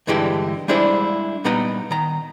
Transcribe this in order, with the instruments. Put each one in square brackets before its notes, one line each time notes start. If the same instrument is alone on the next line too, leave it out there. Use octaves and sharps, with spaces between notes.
[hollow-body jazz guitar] G2 D3 E3 G#3 G4
G3 G#3 D4 E4 G#4 C5
A#2 G3 B3 D#4 A#5
D#3 A#5